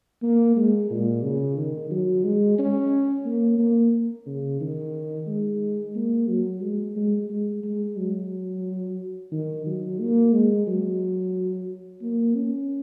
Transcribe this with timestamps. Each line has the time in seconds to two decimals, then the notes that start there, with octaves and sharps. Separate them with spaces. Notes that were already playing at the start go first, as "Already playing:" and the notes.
0.22 A#3
0.56 G#3
0.90 A#2
1.23 C#3
1.57 D#3
1.91 F#3
2.24 G#3
2.59 C#4
3.25 A#3
3.59 A#3
4.26 C#3
4.61 D#3
5.27 G#3
5.95 A#3
6.29 F#3
6.62 G#3
6.96 G#3
7.30 G#3
7.64 G#3
7.97 F#3
9.32 D#3
9.66 F#3
10.00 A#3
10.33 G#3
10.67 F#3
12.02 A#3
12.35 C#4